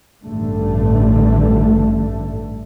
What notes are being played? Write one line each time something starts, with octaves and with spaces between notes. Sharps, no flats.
A1 G2 D3 A3